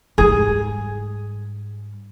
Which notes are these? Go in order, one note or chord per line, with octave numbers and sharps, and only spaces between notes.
G#2 G3 G#4